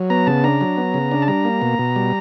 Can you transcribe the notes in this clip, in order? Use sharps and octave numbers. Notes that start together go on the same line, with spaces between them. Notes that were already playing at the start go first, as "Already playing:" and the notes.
Already playing: F#3
B3 A#5
C#3 A5
D4 A#5
F#3
B3
C#3
D4
A5
G3 A#5
A#3
B2
B2
G3